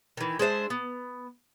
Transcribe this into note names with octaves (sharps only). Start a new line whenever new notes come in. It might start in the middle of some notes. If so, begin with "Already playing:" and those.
D#3 E3
G#3 D4 C5 E5
B3